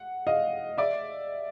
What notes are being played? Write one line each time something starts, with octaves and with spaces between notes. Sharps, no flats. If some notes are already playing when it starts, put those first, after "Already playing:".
Already playing: F#5
D#5 F5
D5 E5